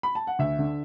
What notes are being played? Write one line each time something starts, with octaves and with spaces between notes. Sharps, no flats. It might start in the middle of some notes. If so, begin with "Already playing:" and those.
B5
A5
F#5
D2 E5
D3